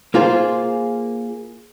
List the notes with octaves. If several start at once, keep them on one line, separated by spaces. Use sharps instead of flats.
A#3 F4 G#4 C5